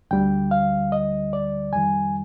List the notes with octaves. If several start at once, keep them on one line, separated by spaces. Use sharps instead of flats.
D2 D3 G3 G5
F5
D#5
D5
F2 D#3 G3 G#5